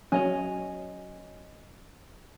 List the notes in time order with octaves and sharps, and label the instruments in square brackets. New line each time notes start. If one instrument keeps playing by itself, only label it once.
[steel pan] F#3 C#4 [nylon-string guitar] C#5 D#5 G#5